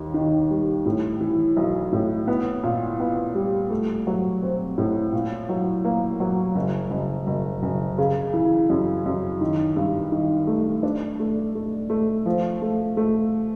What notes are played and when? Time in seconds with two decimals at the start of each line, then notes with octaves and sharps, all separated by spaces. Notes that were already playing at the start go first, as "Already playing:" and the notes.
Already playing: D#2
0.14 D#3
0.50 G3
0.86 A2
1.21 E3
1.57 B1
1.93 A2
2.27 B3
2.63 A#2
3.00 B3
3.35 G3
3.71 A3
4.07 F#3
4.43 C4
4.78 A2
5.13 A#2
5.49 F#3
5.85 A#3
6.20 F#3
6.55 F#1
6.91 F#1
7.27 F#1
7.63 F#1
7.98 C#3
8.34 E3
8.70 F#2
9.06 F#2
9.41 D#3
9.76 G2
10.12 D#3
10.47 A3
10.83 D4
11.20 A3
11.55 A3
11.90 A3
12.26 F3
12.62 A3
12.97 A3